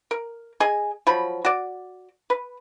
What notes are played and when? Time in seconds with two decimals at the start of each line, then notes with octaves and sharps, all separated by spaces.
0.11 A#4
0.60 G#4 D#5 G#5
1.07 F3 F#3 B5
1.45 F#4 D5
2.30 B4